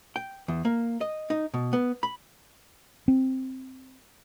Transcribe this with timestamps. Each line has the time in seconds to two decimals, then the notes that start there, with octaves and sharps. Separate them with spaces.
0.16 G5
0.48 E2
0.65 A#3
1.01 D#5
1.30 D#4
1.54 B2
1.73 B3
2.03 B5
3.08 C4